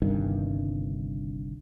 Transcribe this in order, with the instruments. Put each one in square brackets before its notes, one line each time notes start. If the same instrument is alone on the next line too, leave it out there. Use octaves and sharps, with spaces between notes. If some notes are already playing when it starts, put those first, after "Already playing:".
[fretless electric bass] G1 C2 G2 D#3